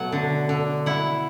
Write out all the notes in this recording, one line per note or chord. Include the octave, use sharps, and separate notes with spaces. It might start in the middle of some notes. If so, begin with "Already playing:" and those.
Already playing: B2 F#3 A3 F#5
D3
D3
E4 F#5